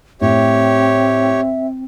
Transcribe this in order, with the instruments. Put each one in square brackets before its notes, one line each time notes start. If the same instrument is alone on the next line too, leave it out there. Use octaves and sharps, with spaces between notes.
[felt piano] A2 [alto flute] C4 [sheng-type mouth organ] G4 C#5 [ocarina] E5